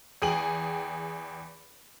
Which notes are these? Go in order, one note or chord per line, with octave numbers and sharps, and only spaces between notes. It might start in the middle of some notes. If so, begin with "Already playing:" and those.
E2 G#4 G5 D#7 F#7